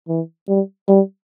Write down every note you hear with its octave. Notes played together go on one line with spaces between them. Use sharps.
E3
G3
G3